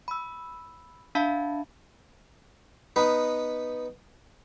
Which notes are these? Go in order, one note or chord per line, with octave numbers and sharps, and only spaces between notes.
B5 E6
D4 E5 F5 A5 B5
B3 D#4 B4